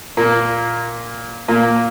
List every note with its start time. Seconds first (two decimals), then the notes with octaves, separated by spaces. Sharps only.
0.17 A#2 A#3
1.48 A#2 A#3